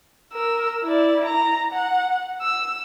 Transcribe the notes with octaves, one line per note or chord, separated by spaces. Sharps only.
A#4 E6
E4 D5
A#5
F#5
E6